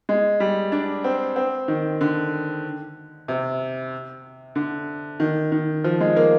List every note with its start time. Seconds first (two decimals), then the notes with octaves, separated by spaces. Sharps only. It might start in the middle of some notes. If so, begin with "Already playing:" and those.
0.09 G#3
0.40 G3
0.72 D4
1.04 C4
1.36 C4
1.68 D#3
2.01 D3
3.28 C3
4.56 D3
5.20 D#3
5.52 D#3
5.84 F3
6.00 G#3
6.16 A#3